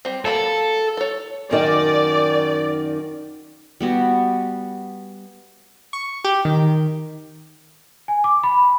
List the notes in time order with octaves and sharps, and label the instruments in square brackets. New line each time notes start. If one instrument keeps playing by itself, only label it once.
[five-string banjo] G3 C4
[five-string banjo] F#3 A#3 B5 [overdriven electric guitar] A4
[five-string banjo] A4 C#5
[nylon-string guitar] F#2 D#3 [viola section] D5
[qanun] G3 B3 F#4
[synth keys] C#6
G4
D#3
[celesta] G#5
D6
B5